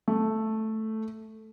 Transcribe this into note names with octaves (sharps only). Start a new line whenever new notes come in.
A3